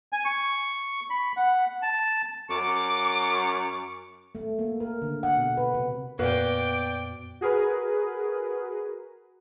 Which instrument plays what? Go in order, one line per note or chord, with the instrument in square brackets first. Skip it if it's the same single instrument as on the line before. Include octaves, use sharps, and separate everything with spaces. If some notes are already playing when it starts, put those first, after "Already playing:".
[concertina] G#5
C#6
B5
F#5
A5
[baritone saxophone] F#2 [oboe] C#6 [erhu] D6
[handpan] A3
A#3
A#4
D3
F#5
B2
B4
C3
[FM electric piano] F2 A#2 B3 [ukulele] F#4 B4 F5 [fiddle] D5 G5
[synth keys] F#4 G#4 A#4 B4